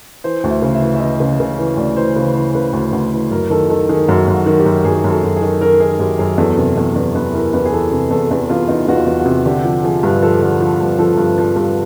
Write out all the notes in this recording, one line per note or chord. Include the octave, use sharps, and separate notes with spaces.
E3 C5
D2
E5
C#3
E5
E3
E5
E3 D#5
C#3
C#3
E3
D2 D5
E3 C5
C#3 B4
E3 C5
C#3 B4
D2
D2
E3
F#2 A#4
D#3 A4
D#3 A4
D#3 G#4
F#2 F#4
F#2
F#4
D#3
G4
F#2
F#2 G#4
F#2
A4
F#2
G#4
D#3
D#3 A#4
D#3 G#4
F#2 G4
F#2 G#4
E2 A4
C3
E2
E2
E2 B4
E3 A#4
E2 B4
G#4
E3 A4
C3
E2 A4
E2 A4
E2 F4
E2 D#4
E2 F#4
F4
E2
F#4
C3
D3 G4
F3
F3 G#4
G2
F3 A4
D3
F3
G2
F3 A4
G2
F3
G2